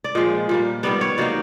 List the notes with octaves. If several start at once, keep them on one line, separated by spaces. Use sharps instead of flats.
D5
A#2 F3 G#3 D#5
A#2 G3 A#3
D#3 G3 B3 D5
C#5
D#3 F#3 A#3 D#4 D5